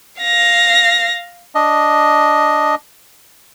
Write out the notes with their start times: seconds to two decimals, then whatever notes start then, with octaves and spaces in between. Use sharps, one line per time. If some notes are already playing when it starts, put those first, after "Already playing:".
0.21 F5 A#6
1.55 D4 D#5